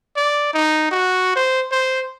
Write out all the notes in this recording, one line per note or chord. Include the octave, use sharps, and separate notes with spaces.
D5
D#4
F#4
C5
C5